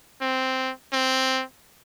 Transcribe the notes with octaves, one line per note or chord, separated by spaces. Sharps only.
C4
C4